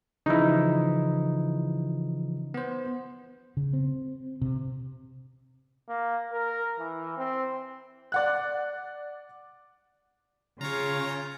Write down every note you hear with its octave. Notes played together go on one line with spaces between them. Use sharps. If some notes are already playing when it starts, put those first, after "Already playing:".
C#3 E3 F3 D#4 E4
B3 C5
C#3
C4
C3
A#3
A#4
E3
C4
D5 F#5 F#6
C#3 F4 C#5 A#5